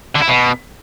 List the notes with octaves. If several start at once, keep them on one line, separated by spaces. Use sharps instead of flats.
D3
E4
B2